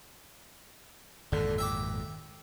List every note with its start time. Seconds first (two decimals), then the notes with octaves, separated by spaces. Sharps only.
1.32 G#1 F2 A#2 D3
1.58 E5 G5 D6